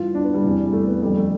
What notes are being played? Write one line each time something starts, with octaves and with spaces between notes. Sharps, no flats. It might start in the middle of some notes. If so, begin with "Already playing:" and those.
Already playing: G2 E3 F4
D4
B3
G3
E2 C3 E3
G3
A3
B3
F2 D3 G3
A3